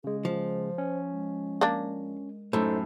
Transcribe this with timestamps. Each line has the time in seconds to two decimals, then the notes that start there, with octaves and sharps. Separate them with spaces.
0.04 C#3 G#3 G#4
0.25 F3 C5
0.78 C#4
1.11 G#3
1.61 A#3 D4
2.53 F#2 A2 D#4 A4 C5